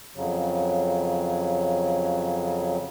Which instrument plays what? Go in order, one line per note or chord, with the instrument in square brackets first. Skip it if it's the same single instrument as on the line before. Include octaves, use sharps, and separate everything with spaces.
[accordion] F2 C#3 F#3